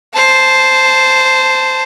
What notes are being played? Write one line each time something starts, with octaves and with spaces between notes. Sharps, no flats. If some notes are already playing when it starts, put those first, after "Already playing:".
C5 A5